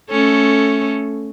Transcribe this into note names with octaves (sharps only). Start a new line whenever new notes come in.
A3 C#4 A4